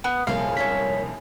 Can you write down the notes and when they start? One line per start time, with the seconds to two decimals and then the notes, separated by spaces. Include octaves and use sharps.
0.04 B3
0.27 C2 F2 A#2 C#3 G#3 C#4 F5
0.57 C#4 D#4 C#5 E5 B6